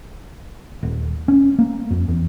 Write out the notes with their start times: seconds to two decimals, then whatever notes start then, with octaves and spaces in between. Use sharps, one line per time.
0.83 D#1
1.28 C#4
1.59 A#3
1.90 F2
2.08 E2